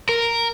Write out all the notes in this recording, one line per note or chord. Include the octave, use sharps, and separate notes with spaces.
A#4